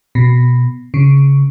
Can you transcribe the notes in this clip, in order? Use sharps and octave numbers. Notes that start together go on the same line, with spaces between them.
B2
C#3